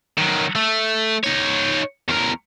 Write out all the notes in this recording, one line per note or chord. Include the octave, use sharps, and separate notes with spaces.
D#3 F#3
A3
D#4 C#5
E2 A#4